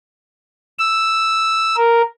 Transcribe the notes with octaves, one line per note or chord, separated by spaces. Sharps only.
E6
A#4